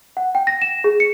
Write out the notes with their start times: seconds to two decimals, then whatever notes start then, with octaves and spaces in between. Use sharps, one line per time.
0.17 F#5
0.35 G5
0.47 A#6
0.62 E7
0.84 G#4
1.00 C#7